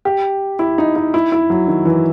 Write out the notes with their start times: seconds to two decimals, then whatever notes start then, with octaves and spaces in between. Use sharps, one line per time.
0.05 G4
0.59 E4
0.78 D#4
0.96 D#4
1.14 E4
1.32 E4
1.50 F#3
1.68 D#3
1.85 E3